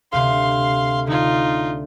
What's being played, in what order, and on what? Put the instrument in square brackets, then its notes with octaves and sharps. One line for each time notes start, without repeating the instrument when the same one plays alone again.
[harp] D2 C3 [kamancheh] F5 C6
[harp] D3 [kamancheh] D#4 F4